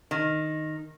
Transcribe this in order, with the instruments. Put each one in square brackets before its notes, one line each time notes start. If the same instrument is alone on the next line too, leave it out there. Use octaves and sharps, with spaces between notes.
[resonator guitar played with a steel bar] D#3